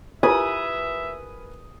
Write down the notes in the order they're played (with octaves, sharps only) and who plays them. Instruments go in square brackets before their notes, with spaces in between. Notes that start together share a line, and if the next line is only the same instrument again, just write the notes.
[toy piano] E4 F4 G4 [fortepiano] A#4 B4 G#5 [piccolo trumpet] E5 [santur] D#6